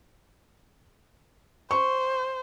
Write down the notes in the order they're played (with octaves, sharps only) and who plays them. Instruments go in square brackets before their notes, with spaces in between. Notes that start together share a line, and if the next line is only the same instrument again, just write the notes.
[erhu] C5 [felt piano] C#6